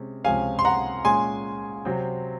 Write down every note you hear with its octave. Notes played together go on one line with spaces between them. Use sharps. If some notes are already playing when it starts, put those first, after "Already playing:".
Already playing: C3 G#3 C#4
C#2 C3 F3 G#3 C#4 F5 G#5
C6
F#5 A#5
A#2 G#3 C#4 G#5 C6
C3 F#3 C4